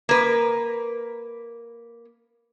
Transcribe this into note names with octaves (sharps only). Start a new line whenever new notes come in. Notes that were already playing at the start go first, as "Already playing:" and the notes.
A#3 B4